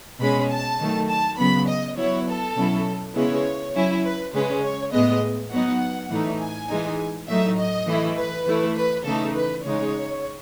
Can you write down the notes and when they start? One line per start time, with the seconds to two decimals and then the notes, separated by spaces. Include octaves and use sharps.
0.20 B2 G#3 C#4 B5
0.49 A5
0.79 D#3 F#3 A3
1.09 A5
1.38 C#3 F#3 B3 B5
1.68 D#5
1.97 F#3 B3 E4 C#5
2.27 A4
2.56 B2 F#3 C#4 E4
3.14 C#3 G#3 B3 E4 C#5
3.74 F#3 C#4 E4
4.04 B4
4.33 C#3 G#3 C#4 B4
4.62 C#5
4.92 A2 G#3 B3 D#5
5.50 F#3 B3 D#4 F#5
6.09 A2 E3 A3 D#4
6.40 G#5
6.69 E3 G#3 D#4
7.28 A2 F#3 A3 D#4 E5
7.57 D#5
7.87 E3 A3 E4
8.17 B4
8.46 E3 A3 E4
8.76 B4
9.05 C#3 E3 A3 D#4 A4
9.34 B4
9.63 C#3 G#3 D#4 C#5